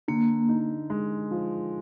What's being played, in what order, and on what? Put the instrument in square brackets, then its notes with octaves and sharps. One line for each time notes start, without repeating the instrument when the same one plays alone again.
[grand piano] D3 [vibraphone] A#3
[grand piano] D#4
G#3
F3